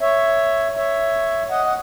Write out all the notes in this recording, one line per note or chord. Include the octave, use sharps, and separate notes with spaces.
C#5 E5
C#5 E5
D#5 F#5
F#5